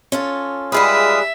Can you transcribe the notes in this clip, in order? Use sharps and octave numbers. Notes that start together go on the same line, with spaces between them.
C#4 F4 A4
G3 G#3 F4 G#4 B4 E5 D#6